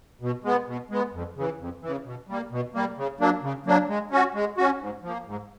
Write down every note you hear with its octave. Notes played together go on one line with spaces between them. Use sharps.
B2
G#3 B3
B2
G#3 B3
F2
C#3 E3
F2
C#3 E3
B2
G3 A#3
B2
G3 A#3
C#3
F#3 A#3 D4
C#3
F#3 A#3 D4
G#3
C#4 F#4
G#3
C#4 F#4
G#2
F3 A#3
G#2